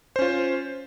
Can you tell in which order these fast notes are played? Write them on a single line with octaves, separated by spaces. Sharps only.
C5 C#4 F4